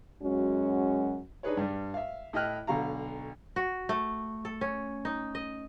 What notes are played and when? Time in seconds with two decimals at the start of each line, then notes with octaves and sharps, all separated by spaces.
0.23 F#2 G#3 C#4 F#4
1.43 D4 D#4 G#4 B4 C#5
1.57 G2 G3
1.94 E5 F5
2.33 A2 E4 D#5 G5 F6 F#6
2.67 B1 D3 F#4 F5 A#5
3.56 F#4
3.89 A3
4.45 A4
4.61 C#4
5.05 D#4
5.35 D#5